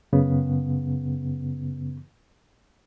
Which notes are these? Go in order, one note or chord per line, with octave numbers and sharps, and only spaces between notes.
F#2 C#3 B3